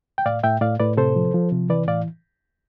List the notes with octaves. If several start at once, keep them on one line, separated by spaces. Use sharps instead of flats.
G5
A2 D5 F5
A2 E5 G5
A2 D5 F5
A2 B4 D5
C3 A4 C5
F3
F3
C3
E3 B4 D5
A2 D5 F5